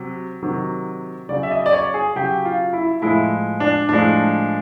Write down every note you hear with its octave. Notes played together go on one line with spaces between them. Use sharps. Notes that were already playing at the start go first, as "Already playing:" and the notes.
Already playing: C3 F#3
C3 D#3 F#3
C#3 F#3 D5
E5
D#5
D5
C#5
G#4
C#3 F#3 G4
F4
E4
A2 F3 G#3 E4
D4
A2 F3 G#3 D4